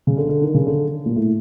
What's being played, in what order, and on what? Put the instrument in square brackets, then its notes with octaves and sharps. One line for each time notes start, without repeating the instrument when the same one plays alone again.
[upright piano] C#3
D3
D3
D#3
C#3
D3
A#2
A2